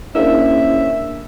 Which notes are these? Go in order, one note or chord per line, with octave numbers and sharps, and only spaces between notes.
A#3 C#4 D4 E4 G#4 C5 E5 E6